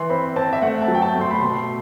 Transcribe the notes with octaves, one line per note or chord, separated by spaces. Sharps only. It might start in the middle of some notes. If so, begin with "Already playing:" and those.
Already playing: E3 C6
C4 B5
C4 A5
E5
A3 F#5
A5
F#3
G5
A5
A3
C6
B5
B2 C6